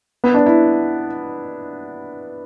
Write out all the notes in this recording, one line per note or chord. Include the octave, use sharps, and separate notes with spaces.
B3
D4
E4